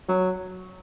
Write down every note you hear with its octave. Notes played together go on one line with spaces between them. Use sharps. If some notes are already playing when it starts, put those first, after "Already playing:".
F#3